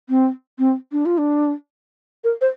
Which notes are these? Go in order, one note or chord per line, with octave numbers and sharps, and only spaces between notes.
C4
C4
D4
F4
D4
A#4
C5